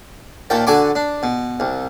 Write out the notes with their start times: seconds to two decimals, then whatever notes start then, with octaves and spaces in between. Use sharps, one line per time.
0.50 D#2 A#2 G5 A5
0.67 D3 F#4 G#5 A5 C#6 D6
0.95 D4
1.23 B2
1.60 C2